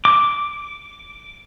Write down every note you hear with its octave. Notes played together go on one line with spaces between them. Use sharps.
D6